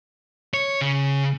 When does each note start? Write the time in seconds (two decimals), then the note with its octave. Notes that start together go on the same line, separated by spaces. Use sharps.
0.54 C#5
0.81 C#3